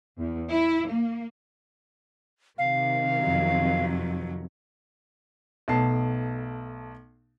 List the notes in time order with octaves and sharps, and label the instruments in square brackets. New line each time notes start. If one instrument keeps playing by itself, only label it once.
[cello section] E2
E4
A#3
[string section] C3 D#3 [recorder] F5
[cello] F2 F#3
[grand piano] B1 A3 B3 A5 C7